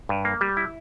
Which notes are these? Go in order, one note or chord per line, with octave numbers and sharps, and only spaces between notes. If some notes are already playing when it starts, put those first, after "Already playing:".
G2
A#3
G3
E4